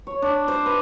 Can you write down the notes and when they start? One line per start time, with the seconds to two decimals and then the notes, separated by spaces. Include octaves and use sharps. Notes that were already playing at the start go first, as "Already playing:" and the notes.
0.07 C#5
0.22 D4
0.48 C5
0.66 B4